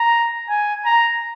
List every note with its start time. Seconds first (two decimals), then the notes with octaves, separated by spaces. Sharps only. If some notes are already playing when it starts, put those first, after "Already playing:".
Already playing: A#5
0.50 G#5
0.85 A#5